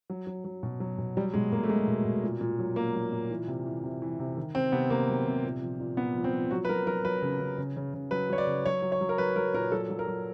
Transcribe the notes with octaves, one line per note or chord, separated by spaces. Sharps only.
F#3
F#3
F#3
B2
F#3
B2
F#3 G3
B2 G#3
B2 A#3
A3
F#3 G#3
B2
B2
A#2
A#2
F#3
A#2 A#3
F#3
A#2
E3
C3
E3
C3
E3
C3
D#3
C3 C4
C3 B3
C3 A#3
F#3
C3
A#2
F3
A#2
A#2 B3
F3
C4
F3
F#3 F#4
B4
F#3 A#4
F#3 A#4
F#3 B4
C#3
C#3
C#3
C#3
C#3
F#3 B4
F#3 C#5
D5
C#3
F#3 C#5
F#3
C#5
F#3
A#4
F#3 B4
F#3 A#4
A#2 A#4
F#3 A4
F#3
A#4
F#3